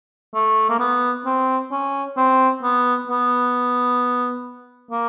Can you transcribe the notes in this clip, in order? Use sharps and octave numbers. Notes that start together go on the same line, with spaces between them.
A3
A#3
B3
C4
C#4
C4
B3
B3
A#3